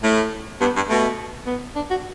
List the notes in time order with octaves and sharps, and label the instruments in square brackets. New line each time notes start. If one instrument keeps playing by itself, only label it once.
[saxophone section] A2 [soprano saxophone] A3
[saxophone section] G2 [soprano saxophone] B3
[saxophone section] G2
[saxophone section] B2 [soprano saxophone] A3
[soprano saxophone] B3
D4
F#4